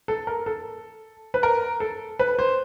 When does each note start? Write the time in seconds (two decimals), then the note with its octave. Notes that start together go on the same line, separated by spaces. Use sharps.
0.08 A4
0.27 A#4
0.46 A4
1.34 B4
1.43 A#4
1.80 A4
2.19 B4
2.39 C5